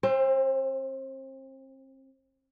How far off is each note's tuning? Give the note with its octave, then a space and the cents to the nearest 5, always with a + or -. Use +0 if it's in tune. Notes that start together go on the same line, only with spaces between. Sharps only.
C4 +35 C5 +0